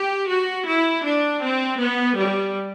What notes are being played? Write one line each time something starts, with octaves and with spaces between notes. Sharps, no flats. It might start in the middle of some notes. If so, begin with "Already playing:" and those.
Already playing: G4
F#4
E4
D4
C4
B3
G3